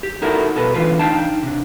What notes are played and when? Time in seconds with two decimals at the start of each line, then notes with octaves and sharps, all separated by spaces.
0.03 G4
0.22 D#4 E4 F#4 A4 A#4
0.56 B2 A4 B4
0.74 D3 E3 F4 B4
0.99 D4 D#4 F5 G5 A5
1.43 C3 D4